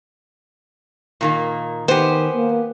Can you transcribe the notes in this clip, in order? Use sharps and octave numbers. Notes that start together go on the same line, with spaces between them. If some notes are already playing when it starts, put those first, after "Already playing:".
A#2 D#3 A#3
D#3 B3 G4 C5 G#5
A#3